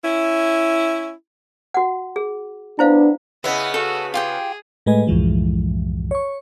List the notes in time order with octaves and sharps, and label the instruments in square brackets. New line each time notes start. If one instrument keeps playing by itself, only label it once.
[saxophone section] C#4 E4
[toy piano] F#4 F#5
G#4
[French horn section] B3 D4 [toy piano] E4 C5 F5
[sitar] C#3 B3 [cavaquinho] E4 E5 [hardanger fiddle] D#5 F#5
[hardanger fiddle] F#4 [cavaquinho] A4
[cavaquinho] F4 G4 G5 [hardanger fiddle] G#4
[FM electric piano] A2 G#3 A3 B4 D#5 G#5
C2 F#2 A2 E3 F3 G#3
C#5 C#6